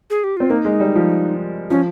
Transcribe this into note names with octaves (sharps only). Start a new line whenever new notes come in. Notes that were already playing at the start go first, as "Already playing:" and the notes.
G#4
G4
C4 F4
A#3 D#4
G#3
G3
F3
F3 C#4